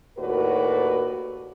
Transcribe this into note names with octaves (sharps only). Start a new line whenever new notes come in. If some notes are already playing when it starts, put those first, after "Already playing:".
D#2 A2 F#4 A#4 B4 D5